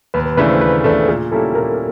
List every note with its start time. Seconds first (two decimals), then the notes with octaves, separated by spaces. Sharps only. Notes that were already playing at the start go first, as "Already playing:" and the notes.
0.14 D#2 B4
0.26 B4
0.37 C#3 E3 A3 D4 B4
0.49 C5
0.61 D#2 B4
0.84 C#3 E3 A3 D4 A4
1.08 A#2 G#4
1.32 G3 A#3 C#4 E4 A4
1.55 A#2 A#4